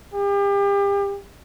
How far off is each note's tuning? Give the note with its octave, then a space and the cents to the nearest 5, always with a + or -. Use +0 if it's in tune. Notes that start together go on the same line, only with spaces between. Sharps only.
G4 +35